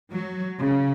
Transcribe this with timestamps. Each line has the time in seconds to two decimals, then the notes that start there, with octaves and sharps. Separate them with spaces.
0.11 F#3
0.59 C#3